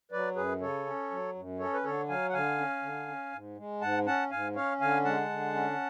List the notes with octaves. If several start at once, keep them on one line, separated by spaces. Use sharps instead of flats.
F#3 B4 D5
F#2 G#4 B4
C#3 A4 C#5
C#4
F#3
F#2
C#4 A4 C#5
B4
D3 A4 C#5
F#3 F5 G#5
F#5
D3 F5 G#5
C#4
D3
C#4
G#2
G#3
G#2 F#5 A5
C#4 F#5 A5
G#2 F5 G#5
C#4 C#5 F5
D3 F5 G#5
G#3 F#5 A5
D3
C#4